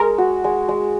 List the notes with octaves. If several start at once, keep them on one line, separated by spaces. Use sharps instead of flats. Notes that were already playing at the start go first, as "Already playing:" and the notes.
Already playing: G#3 A#4
F#4
G#3
G#3